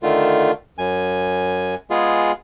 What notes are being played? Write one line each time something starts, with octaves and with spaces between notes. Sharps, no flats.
D3 D#3 A3 F4
F#2 G#5
G#3 B3 F4 G#4